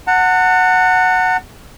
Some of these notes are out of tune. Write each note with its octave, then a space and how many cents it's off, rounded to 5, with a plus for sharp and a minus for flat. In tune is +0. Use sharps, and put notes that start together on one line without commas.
F#5 +0 A5 +45